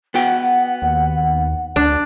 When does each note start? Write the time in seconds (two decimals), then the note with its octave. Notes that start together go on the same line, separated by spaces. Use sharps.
0.14 B3 F#4 F#5 G5
0.82 D#2
1.76 D2 D4